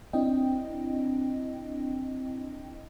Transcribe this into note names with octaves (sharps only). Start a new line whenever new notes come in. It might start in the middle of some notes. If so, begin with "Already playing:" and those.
C4 D4 E4 D#5 G5